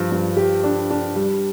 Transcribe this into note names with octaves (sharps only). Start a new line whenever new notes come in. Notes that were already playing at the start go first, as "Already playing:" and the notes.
Already playing: G2 F3
G2
G4
D4
D4
G3